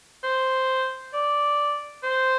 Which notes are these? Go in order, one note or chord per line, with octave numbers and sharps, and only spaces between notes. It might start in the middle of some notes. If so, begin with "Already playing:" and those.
C5
D5
C5